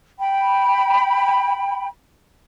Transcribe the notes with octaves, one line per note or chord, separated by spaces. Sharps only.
G5 B5